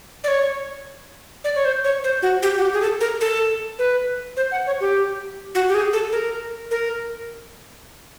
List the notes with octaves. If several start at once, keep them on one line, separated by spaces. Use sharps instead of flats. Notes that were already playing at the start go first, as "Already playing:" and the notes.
D5
C#5
D5
C#5
C5
C#5
C5
F#4
G4
F#4
G4
G#4
A4
A#4
A4
B4
C5
F#5
C#5
G4
F#4
G4
G#4
A4
A#4
A#4